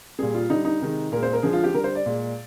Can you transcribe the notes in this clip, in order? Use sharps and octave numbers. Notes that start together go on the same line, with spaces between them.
A#2 G3 G#4
F4
D3 G3 D#4
D#4
C3 D#3 G#3
A#2 G#3 A#4
C5
A#4
D3 F3 G#3 G#4
F4
G4
D3 G3 A#4
C5
D5
A#2 G#3